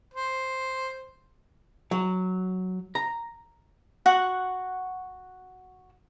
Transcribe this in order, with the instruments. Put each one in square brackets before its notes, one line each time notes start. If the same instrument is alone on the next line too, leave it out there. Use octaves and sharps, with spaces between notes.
[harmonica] C5
[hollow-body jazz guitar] F#3
A#5
[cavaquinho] F#4 F#5 C#6